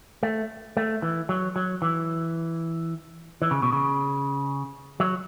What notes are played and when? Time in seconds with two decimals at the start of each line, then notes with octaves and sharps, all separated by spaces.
0.23 A3
0.77 A3
1.02 E3
1.29 F#3
1.56 F#3
1.82 E3
3.42 E3
3.51 C#3
3.62 B2
3.72 C#3
5.00 F#3